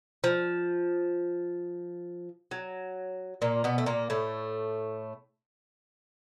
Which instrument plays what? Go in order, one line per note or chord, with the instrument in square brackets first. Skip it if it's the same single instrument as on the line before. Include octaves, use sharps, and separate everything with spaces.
[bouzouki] F3
F#3
A#2 A#3
B2 B3
A3
A#2 A#3
A2 A3